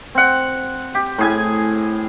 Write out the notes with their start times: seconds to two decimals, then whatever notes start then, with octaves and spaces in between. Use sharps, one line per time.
0.15 C4 F#5
0.95 G4
1.18 A2 G#4 G#5